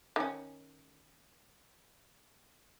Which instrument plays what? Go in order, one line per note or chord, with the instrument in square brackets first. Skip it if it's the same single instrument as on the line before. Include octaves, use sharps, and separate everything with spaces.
[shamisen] D#3 C#4